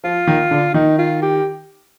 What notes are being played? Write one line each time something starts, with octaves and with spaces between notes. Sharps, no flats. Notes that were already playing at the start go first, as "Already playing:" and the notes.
F3 F4
D#3
D3
D#3 D#4
F4
G4